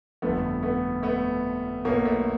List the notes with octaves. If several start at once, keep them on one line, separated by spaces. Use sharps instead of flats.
G1 F2 D3 A3 B3
A3 B3
A3 B3
B1 B2 A#3
A3